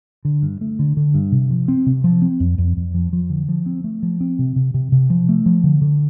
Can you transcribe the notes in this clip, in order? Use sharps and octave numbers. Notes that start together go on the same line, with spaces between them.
D3
G2
A3
D3
D3
G2
C3
F3
C4
C3
F3
C4
F2
F2
F2
F3
F3
D3
F3
C4
A3
F3
C4
C3
C3
C3
C3
F3
A3
F3
D3
D3